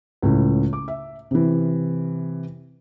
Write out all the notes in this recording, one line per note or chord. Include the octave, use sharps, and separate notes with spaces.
C#2 A2 C#3
D6
E5
C3 E3